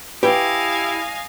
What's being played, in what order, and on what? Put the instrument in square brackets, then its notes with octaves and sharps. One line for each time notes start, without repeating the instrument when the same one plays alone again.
[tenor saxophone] E4 [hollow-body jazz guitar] G4 [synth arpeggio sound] B4 [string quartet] D#5 F5 G#5